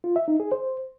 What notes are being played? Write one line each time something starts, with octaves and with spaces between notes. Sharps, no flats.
F4
E5
D#4
G#4
C5